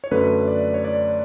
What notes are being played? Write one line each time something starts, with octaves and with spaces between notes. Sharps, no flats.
C#5
F#2 D3 A3 B4
D5
C#5
D5